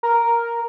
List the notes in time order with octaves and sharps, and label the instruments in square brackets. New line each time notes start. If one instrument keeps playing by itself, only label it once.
[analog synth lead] A#4